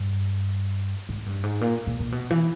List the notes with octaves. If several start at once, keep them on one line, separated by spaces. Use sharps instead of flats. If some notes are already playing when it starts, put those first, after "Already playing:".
Already playing: G2
G#2
G2
G#2
A#2
A#2
A#2
B2
E3